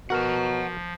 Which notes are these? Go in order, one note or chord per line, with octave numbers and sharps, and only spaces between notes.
B2 F3 F#4 A#4 F#5 A#5